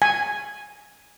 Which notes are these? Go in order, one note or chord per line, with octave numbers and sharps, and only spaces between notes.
G#5